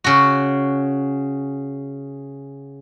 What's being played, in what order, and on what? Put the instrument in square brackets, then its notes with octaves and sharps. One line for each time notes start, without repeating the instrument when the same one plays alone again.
[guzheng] C#3 F#4